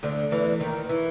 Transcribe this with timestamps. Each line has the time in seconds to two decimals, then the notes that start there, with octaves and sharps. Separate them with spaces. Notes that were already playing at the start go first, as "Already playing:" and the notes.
0.03 D2 D3
0.31 E2 E3
0.60 D#2 D#3
0.89 E3